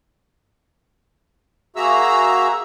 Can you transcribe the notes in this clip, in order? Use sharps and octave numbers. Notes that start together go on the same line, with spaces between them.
A#3 F#4 G#4 E5 A#5 E6